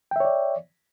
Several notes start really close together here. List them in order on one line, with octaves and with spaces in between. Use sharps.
G5 E5 C#5 D5